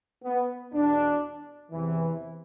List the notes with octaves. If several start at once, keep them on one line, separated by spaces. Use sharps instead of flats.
B3
E2 B2 D4
E2 C3 E3